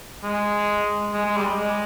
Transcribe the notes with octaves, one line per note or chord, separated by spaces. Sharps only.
G#3
G#3
G#3
G3
G#3